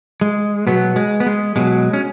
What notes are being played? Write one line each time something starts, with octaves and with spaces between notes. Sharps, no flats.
G#3
B2 F#3 B3
G#3
B3
G#3
B2 F#3 G#3
C#4